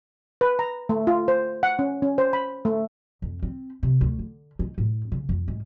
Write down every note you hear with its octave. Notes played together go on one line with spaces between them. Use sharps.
B4
A#5
A3
F4
C5
F#5
C#4
C#4
C5
B5
A3
F2
C4
C3
D2
D3
D#4
A2
C#3
F2
G#2